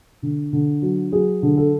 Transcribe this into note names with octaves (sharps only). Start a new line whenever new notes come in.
D3
D3
F#3
F#3 G#4
D3
A4